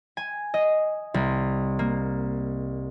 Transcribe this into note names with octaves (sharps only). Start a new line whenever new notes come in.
G#5
D#5
C2
A#3